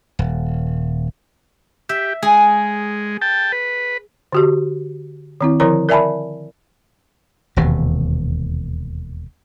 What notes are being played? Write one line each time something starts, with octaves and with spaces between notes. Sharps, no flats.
D#1
G4 E5
G#3 G#4
G5 A5
B4
D3 F#4 G4
D#3 C4 E4
D3 F3 E4 A#4 C#5 A#5
A#4 D5 E5 G#5 A5 B5
E1 D#2 C3